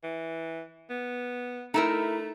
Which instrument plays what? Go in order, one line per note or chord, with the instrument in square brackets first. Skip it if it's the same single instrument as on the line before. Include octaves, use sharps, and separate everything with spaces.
[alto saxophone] E3
B3
[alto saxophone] A3 [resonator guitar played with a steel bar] D#4 E4 A#4